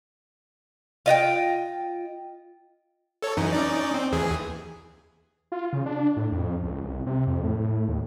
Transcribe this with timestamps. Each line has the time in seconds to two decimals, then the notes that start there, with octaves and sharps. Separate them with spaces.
1.06 F4 D#5 F#5 G5
3.22 A4 C#5
3.37 F#2 E3 D#4
3.53 C#4 D#4 D5
3.94 C4
4.12 D#2 E3 G#4
5.52 F4
5.73 C#3
5.86 D4
6.17 A2
6.32 F2
6.63 C#2
6.84 C2
7.06 C3
7.27 F2
7.44 A2
7.88 D#2